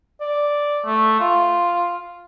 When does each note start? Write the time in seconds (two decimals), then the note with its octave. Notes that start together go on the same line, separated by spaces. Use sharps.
0.21 D5
0.85 A3
1.20 F4